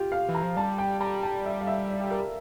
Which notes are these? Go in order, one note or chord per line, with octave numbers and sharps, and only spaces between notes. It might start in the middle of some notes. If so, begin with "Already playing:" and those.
Already playing: F4 G4
F5
E3
A#5
F3
G3 A5
G5
G3 A#5
A5
E5
F5
E5
D5
A#4